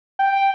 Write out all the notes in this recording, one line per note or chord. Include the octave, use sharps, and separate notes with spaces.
G5